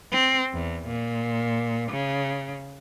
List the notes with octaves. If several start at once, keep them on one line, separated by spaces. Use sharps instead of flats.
C4
E2
A#2
C#3